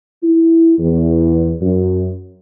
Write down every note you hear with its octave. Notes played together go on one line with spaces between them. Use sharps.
E4
E2
F#2